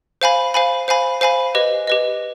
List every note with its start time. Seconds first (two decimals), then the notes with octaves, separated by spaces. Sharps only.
0.21 C5 F5 G#5 B5
0.54 C5 F5 G#5 B5
0.88 C5 F5 G#5 B5
1.21 C5 F5 G#5 B5
1.55 G4 B4 D#5
1.87 G4 B4 D#5